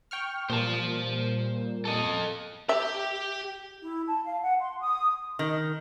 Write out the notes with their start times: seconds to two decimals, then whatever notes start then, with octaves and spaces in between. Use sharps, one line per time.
0.11 G5 C#6 F6
0.50 A#2 G3 C5 A5
1.85 A4 D#5
2.69 G4 E5 G5
3.81 E4
4.07 A5
4.24 F5
4.41 F#5
4.61 C6
4.80 D#6
5.39 D#3